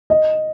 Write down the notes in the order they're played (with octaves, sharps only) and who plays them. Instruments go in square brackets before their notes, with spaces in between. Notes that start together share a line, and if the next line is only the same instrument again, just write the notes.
[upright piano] D#5